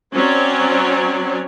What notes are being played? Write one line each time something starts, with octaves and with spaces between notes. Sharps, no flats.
F#3 C4 C#4 C#5 D5